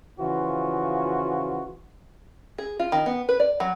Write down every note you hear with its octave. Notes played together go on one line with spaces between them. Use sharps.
C#3 E3 F3 F4 F#4
G#4
F4
D#3
B3
B4
D5
F#3